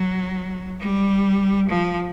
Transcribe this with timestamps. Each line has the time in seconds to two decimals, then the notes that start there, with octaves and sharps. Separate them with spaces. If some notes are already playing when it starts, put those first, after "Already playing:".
Already playing: F#3
0.80 G3
1.69 F3